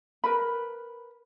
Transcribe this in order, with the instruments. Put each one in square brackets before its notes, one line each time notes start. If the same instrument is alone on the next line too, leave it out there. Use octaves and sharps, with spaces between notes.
[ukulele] A#4 B4 B5